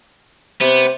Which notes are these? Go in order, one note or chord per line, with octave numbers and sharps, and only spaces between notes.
C3 B3